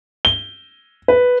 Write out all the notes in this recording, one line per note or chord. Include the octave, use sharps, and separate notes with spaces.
G7
B4